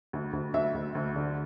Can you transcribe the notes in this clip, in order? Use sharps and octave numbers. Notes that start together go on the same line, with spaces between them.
D2
D2
D2 E5
D2
D2
D3